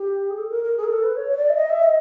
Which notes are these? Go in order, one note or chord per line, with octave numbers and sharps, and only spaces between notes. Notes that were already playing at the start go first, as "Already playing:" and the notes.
Already playing: G4
G#4
A4
A#4
A#4
G#4
A#4
A4
B4
C#5
C#5
D5
E5
D#5
E5
D#5